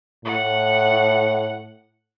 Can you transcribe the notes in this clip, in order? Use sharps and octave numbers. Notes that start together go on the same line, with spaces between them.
A2 F#5